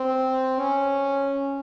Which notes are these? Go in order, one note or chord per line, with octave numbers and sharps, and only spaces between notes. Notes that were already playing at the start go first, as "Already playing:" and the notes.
Already playing: C4
C#4